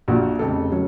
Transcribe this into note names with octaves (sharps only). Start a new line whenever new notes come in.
A#1 A#2 F3 F#4
F1 F2 C#3 A4
C#3 F#3